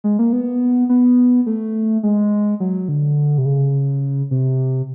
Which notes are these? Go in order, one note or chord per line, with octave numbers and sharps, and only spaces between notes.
G#3
A#3
B3
B3
A3
G#3
F#3
D3
C3
C#3
C3